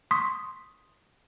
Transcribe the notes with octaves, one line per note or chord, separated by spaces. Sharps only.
C6 C#6 D#6 B6